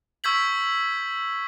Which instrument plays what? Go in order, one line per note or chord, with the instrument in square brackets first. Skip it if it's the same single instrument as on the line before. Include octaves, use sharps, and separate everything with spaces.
[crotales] C#6 E6 G6 G#6 B6 F#7